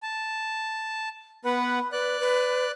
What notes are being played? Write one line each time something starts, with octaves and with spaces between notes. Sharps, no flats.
A5
B3 B4 F#5 B5
B4 D5 F#6
B4